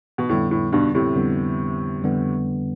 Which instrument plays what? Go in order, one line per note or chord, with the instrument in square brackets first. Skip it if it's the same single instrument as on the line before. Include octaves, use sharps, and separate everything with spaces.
[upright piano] B2
[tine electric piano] F2 D3 G3 B3 [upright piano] A2
[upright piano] A2
G2 B2
A2 C3
[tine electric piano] F2 D3 G3 B3
F2 D3 G3 B3